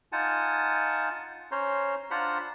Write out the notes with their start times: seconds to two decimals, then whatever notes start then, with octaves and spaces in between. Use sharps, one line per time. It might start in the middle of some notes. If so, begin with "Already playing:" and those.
0.12 D#4 F4 F#5 G#5 A5
1.52 C#4 C5 C#5 A#5 C6
2.11 D4 F4 C5 F#5 A#5 B5